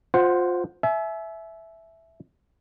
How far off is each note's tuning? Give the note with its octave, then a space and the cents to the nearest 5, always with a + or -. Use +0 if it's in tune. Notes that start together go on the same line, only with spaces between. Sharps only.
F4 +25 C5 +0 F#5 +0
E5 +0 G#5 +45